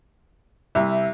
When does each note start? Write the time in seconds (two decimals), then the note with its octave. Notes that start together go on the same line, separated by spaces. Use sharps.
0.75 C2 E5